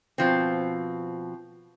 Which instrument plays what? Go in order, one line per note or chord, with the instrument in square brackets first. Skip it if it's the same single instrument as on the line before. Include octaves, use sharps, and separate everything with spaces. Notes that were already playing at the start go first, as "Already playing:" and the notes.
[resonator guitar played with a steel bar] B2 F3 C4